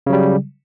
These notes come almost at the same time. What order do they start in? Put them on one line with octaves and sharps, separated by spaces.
C#3 F#3 G3